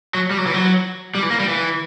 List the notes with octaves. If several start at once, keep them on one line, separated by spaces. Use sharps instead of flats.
F#3
G3
F#3
E3
F#3
G3
E3
A#3
G3
E3